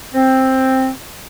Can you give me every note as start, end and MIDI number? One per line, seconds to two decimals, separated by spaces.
0.14 0.89 60